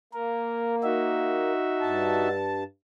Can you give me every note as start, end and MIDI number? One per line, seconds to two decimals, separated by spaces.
0.13 1.52 58
0.13 0.75 70
0.83 2.28 63
0.83 2.28 66
0.83 2.28 76
1.81 2.64 43
1.81 2.64 81